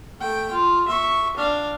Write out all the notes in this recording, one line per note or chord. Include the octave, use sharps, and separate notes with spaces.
A3 G5
F4
E5 C#6
D4 F5